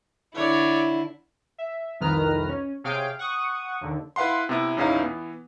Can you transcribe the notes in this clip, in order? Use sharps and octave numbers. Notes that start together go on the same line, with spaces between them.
D3 E4 C#5 D5
E5
C2 F2 D#3 B4 A#5 F6
C#4
C3 G#4 C#5 F5 G5 D7
F#5 C#6 D#6
D#2 D3
E4 B4 F5 F#5 C6
C3 B3 E4
A#1 E2 C#4 D#4 E4 F5
E3 B3